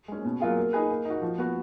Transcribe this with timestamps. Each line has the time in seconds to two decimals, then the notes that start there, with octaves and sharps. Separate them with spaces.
0.08 G#3 C#4
0.25 B2
0.40 F#3 A#3 F4 G#4
0.57 A#3
0.73 D#4 G#4 B4
0.89 A#3
1.05 D#4
1.10 F#4
1.22 F3
1.38 B3 F#4